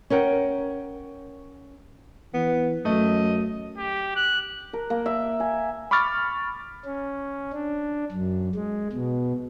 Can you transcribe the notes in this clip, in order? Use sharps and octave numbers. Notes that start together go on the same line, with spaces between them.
C#4 A#4 F#5 G5
E3 B3
F#2 A3 D#5
G4
F#6
A#4
A#3
E5
G#5
B5 C#6 D6 F6 A6
C#4
D4
F#2
G#3
B2